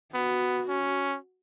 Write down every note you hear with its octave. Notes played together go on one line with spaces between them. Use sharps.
B3 F#4
C#4